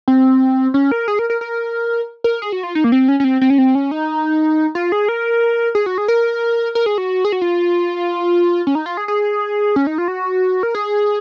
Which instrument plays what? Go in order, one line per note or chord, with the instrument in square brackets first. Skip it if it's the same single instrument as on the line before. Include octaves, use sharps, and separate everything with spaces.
[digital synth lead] C4
C#4
A#4
G#4
A#4
A#4
A#4
A#4
G#4
F#4
F4
D#4
A#3
C4
C#4
C#4
C4
C4
C#4
C4
C#4
D#4
F4
G#4
A#4
G#4
F#4
G#4
A#4
A#4
G#4
F#4
G#4
F#4
F4
C#4
D#4
F4
G#4
G#4
C#4
D#4
F4
F#4
A#4
G#4